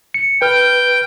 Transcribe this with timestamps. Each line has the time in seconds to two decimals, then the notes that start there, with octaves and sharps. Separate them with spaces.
0.14 C#7
0.42 B4 G5 F6